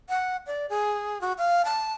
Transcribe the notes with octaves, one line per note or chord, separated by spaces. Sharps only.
F#5
D5
G#4
F#4
F5
A5